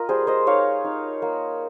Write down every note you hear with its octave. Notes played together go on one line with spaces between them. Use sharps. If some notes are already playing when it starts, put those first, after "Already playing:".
Already playing: F4 A#4 D#5
G3 G#4 C5
C5 D#5
D#4 C#5 F5
D#4
A#3